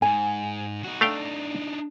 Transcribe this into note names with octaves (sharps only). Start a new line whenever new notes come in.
G#2 G#5
D#4 F#4
A3 D4 D#4 F5 G5